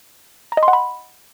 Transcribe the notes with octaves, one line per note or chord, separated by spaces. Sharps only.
A#5
D#5
C6
F#5
B5